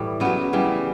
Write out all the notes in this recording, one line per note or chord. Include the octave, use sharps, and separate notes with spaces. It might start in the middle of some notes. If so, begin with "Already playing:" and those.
Already playing: A2 E3 G3 A3
C#3 F#3 B3
C#3 E3 G3